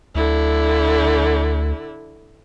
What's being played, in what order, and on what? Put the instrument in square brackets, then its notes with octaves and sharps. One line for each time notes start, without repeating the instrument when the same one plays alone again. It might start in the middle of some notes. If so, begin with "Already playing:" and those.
[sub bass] D2 [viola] D3 E4